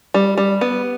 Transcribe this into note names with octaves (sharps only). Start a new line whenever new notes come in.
G3
G3
B3